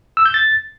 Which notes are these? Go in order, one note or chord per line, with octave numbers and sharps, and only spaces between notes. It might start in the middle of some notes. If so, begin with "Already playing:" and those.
E6
G6
A6